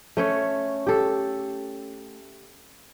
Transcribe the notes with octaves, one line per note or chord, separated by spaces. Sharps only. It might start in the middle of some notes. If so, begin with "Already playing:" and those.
A3 C#4 C#5
G4 A4